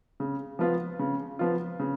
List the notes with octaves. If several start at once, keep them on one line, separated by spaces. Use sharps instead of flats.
C#3
F3 B3 F4
C#3
F3 B3 F4
C#3